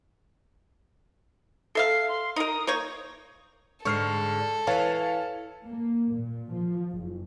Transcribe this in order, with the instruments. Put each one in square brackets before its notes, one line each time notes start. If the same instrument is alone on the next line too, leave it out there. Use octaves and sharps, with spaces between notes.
[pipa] A4 E5 F5 [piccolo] C7
[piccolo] C6
[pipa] D#4 A#4 [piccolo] D#6
[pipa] A#3 C#5 C#6 [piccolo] G6
[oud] G#2 D3 [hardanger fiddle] A4 [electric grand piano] C#6 F6 C7
[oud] E3 [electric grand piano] C#5 F5 A5
[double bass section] A#3
A#2
F3
F#1